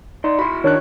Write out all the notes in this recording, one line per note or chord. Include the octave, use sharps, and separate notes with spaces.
D#4 D5 C6
E4 F#4 B5 C6
D#3 D4 C#5 F#6